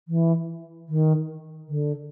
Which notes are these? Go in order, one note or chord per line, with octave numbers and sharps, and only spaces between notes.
E3
D#3
D3